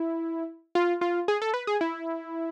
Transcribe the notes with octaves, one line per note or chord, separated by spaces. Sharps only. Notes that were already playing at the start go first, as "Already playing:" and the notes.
Already playing: E4
F4
F4
G#4
A4
B4
G#4
E4